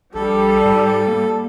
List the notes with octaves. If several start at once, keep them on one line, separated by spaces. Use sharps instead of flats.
A#1 G3 A4
G#2
A#3